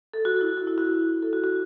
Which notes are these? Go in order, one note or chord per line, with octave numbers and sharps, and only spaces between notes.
A4
F#4
E4
F#4
E4
F#4
A4
F#4
F#4